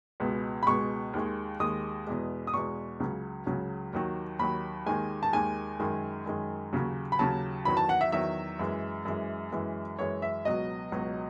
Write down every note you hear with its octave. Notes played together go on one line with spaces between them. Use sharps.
C#2 B2 G#3
B5
C#2 B2 G#3 C#6
D#2 D#3 G#3
D#2 D#3 G#3 D#6
E2 B2 G#3
D#6
E2 B2 G#3 C#6
C#2 C#3 F#3
C#2 C#3 F#3
D#2 D#3 F#3
D#2 D#3 F#3 B5
D#2 D#3 G#3 G#5
A5
D#2 D#3 G#3 G#5
F#2 D#3 G#3
F#2 D#3 G#3
D#2 C#3 F#3
B5
D#2 C#3 F#3 A5
E2 D#3 F#3 B5
A5
F#5
E5
E2 D#3 F#3 E5
F#2 E3 G#3
F#2 E3 G#3
F#2 E3 G#3
F#2 E3 G#3 C#5
E5
C#2 B2 F#3 D#5
C#2 B2 F#3